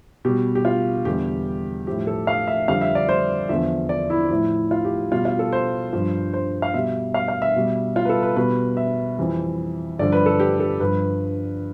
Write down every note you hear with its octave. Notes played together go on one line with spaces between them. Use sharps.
B2 G3 G4
G4
F4
E2 D3 G3 G4
A2 F3 G4
A4
F5
E5
F2 D3 G3 F5
E5
D5
C5
E2 D3 F3 E5
D5
E4
A2 F3 E4
F4
G4
B2 G3 F4
F4
A4
C5
G2 F3
C5
F5
B2 G3 E5
F5
F5
E5
B2 G3
F4
B4
A4
B4
B2 G3 B4
E5
F2 E3 G3
G2 D3 F3 D5
B4
A4
G4
A4
G2 F3 B4